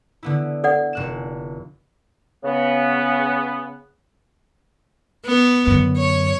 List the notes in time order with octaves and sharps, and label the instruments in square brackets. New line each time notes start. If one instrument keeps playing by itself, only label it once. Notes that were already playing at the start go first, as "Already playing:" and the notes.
[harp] D3 B3 E4
[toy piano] A4 D5 F#5
[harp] F1 F#6 E7
[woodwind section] C#3 B3
[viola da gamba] B3
[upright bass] F#2 D3
[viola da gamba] C#5